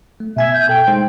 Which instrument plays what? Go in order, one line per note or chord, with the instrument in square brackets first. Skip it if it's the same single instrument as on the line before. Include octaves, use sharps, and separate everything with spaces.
[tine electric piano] A3
[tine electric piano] B2 G#5 G#6 [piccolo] E5
[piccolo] G6
[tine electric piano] A4 [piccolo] G5
[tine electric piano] G#3 D#4 C5